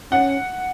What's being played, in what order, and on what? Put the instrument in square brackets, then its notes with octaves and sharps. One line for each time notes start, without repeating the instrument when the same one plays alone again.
[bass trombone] C#4 [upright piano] F#5